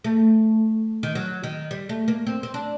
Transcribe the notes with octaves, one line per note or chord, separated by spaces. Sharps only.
A3
D#3
F#3
D#3
G3
A3
A#3
C4
C4
D4